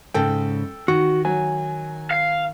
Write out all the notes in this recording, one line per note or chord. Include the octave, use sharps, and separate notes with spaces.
G#2 C#3 A4 G5
D#3 F#4
F#3 G#5
F5